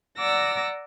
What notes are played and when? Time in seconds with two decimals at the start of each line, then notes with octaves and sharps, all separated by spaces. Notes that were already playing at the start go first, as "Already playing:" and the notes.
0.17 D5 F#5 A#5 D6 E6 A#6